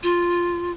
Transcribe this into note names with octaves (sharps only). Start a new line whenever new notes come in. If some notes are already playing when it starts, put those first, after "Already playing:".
F4